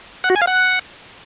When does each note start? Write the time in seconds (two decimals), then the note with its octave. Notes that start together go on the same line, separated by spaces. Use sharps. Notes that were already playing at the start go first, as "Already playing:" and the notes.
0.24 F#5
0.30 F#4
0.36 G#5
0.42 F5
0.47 F#5